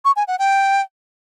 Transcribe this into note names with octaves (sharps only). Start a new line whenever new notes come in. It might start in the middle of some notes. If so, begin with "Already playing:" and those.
C#6
G#5
F#5
G5